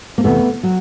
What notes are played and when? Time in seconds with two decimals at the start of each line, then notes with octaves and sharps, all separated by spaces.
0.18 A#3
0.24 E2 C3 E3 A3 B3
0.63 F#3